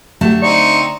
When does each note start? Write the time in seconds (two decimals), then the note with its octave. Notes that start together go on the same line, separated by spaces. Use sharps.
0.21 D3 F#3 A3 G4 A5
0.42 C4 D#4 D5 C#6